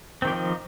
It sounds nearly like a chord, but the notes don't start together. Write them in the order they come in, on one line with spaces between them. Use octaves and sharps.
C4 D#3 G4 F3 D#4